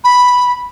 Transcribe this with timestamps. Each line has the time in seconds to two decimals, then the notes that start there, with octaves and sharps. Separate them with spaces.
0.04 B5